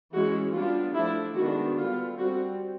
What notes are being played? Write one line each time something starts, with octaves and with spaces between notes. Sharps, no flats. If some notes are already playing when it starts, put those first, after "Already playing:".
E3 G#3 C#4 F#4
G3 B3 D4 F4
F3 A3 D4 E4
D#3 G#3 B3 D4 F#4
D3 G3 B3 F4
G3 C4 F#4